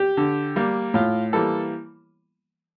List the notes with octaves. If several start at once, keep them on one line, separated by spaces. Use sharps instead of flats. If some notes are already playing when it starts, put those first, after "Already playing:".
Already playing: G4
D3
G3 A#3
A2 F4
E3 G3 A#3 A4